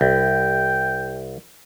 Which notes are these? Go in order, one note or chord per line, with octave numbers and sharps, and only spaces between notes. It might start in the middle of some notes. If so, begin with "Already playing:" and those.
C2 G5